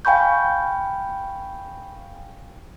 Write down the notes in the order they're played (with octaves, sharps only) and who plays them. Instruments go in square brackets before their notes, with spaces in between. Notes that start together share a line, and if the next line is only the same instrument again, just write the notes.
[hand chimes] F5 G5 G#5 B5 C#6 G6